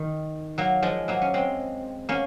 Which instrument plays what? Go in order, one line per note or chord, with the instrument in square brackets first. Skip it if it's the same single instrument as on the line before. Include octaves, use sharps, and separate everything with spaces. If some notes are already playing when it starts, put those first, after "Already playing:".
Already playing: [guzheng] D#3
F#3 A#3
F3 G#3
F#3 A#3
C#4
G#3 C4
A#3 C#4